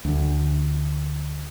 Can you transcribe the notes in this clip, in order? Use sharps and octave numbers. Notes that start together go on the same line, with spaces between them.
D2